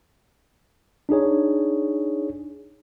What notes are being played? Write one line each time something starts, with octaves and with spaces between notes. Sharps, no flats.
D4 D#4 G#4 C#5